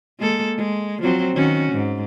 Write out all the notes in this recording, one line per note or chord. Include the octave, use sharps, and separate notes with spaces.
G#3 A#3 A4
G#3
F3 F#3 C4
D#3 C#4 F#4
G#2